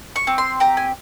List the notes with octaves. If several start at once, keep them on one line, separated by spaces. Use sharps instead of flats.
C#6
C4
C6
G4 A#5
G#5